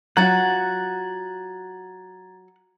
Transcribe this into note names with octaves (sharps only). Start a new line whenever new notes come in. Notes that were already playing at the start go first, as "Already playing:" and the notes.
F#3 F4 F#5 A#5 G#6 A6